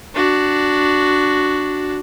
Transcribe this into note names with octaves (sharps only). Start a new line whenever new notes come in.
D4 F#4